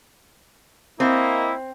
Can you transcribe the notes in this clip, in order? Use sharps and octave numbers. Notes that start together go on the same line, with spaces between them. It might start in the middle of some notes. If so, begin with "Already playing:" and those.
A#3 C4 E4 D#5